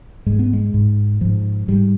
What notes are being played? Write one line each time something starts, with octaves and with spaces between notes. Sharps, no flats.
G#2 G#3
B3
G#3
G#2
G#2 F3
G#2 G3